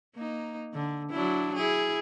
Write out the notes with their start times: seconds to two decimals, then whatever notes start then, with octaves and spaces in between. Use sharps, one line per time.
0.15 A#3 D#4
0.73 D3
1.11 F#3 D4 E4
1.55 E4 G#4